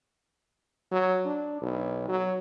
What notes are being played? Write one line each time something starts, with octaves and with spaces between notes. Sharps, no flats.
F#3
D4
B1
F#3